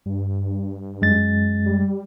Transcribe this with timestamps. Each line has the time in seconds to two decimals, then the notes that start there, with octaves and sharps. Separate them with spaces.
0.06 G2
1.01 F#2 G#3 A6
1.66 G3